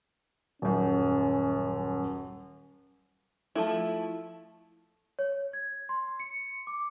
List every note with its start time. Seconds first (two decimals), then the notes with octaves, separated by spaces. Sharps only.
0.62 D#1 F#2 C#4
3.55 F3 A3 E4
5.19 C#5
5.53 G#6
5.89 C6
6.20 C#7
6.67 D6